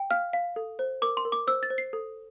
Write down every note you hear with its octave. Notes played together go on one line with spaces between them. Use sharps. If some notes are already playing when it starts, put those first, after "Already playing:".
Already playing: G5
F5 F6
F5
A4
C5
A#4 D6
C6
A#4
D6
C5 E6
A6
C5
C7
A4